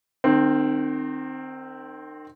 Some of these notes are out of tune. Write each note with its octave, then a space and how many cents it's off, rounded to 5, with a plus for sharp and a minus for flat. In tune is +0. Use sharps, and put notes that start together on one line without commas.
D#3 -35 C4 +0